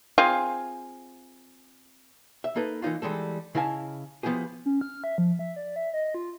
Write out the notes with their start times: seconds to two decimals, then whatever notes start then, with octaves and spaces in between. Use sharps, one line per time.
0.18 C4 F4 G#4 F5
2.44 E5
2.56 A#3 D#4 A4 B4
2.82 E3 A#3 D#4 F4
3.02 E3 G3 G#3 A4
3.55 C#3 E4 D#5 F5 G#5 A5
4.23 F3 B3 E4 G4 G#4
4.66 C#4
4.81 F6
5.04 E5
5.18 F3
5.39 E5
5.56 D5
5.76 E5
5.94 D#5
6.14 F4